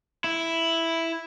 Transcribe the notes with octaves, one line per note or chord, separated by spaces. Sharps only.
E4